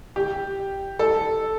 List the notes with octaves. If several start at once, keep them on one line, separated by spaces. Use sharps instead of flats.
G4
A4